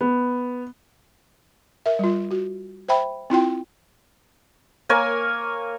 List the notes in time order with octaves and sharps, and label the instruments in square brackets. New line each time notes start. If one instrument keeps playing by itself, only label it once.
[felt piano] B3
[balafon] A#4 E5
G3 F4
F#4
C5 E5 G5 B5
C4 E4 F4 G5
[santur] A#3 A#4 C#5 G#5